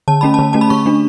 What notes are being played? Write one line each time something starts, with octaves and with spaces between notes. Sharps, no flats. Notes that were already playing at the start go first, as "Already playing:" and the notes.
D3 A5
A3 C#4 B5
D3 A5
A3 C#4 A5
B5
D3 C#6
A3 D4